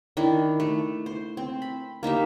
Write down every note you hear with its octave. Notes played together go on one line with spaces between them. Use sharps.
D#3 D4 E4
A3
C5
C4
B5
A#3 D#4 G4 E5